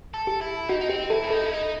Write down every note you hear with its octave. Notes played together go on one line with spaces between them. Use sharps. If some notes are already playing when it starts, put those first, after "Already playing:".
A4
G4
E4
D#4 F#4
D#4
C4 G4
E4 A4
C4
D#4 A4
E4
D#4